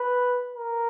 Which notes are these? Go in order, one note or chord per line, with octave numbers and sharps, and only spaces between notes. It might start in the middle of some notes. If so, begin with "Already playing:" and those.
Already playing: B4
A#4